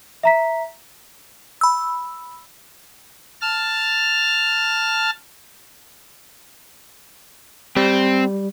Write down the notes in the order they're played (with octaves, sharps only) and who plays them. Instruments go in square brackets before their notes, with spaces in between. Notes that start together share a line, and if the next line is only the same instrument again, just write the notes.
[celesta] E5 A#5 B6
[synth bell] B5 E6
[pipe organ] A5 F6
[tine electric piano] G3 [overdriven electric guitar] C4